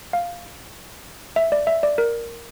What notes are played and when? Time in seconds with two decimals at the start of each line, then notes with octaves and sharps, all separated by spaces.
0.13 F5
1.36 E5
1.52 D5
1.67 E5
1.83 D5
1.98 A#4